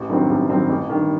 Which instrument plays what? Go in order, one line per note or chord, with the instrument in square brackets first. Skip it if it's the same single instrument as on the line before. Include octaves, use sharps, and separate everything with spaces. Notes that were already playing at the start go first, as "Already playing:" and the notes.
Already playing: [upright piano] A1
G2 D#3 F#3 C4
A1
G2 D#3 F#3 C4
A1
G2 D#3